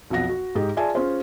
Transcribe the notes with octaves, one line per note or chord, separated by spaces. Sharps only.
B1 F2 B2 F#5 A#6
F#4
G#2 D#4 G4 G#4
F4 G#4 D5 E5 G#5 A5
C#4 F4 G#4 C5